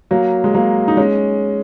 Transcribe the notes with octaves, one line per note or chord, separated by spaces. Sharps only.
F#3 A#3
G#3
F#3 A#3
D#4
G#3 C#4